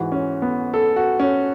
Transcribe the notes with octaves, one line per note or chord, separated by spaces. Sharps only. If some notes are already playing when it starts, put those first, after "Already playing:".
Already playing: G#2 E3 F#4
C#4
B3
A4
F#4
C#4